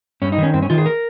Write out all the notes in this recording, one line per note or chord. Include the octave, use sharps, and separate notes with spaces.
G2 C#4
D#4
D#3
C#4
G2 C4
C#4
D#3 F4
G#4
A#4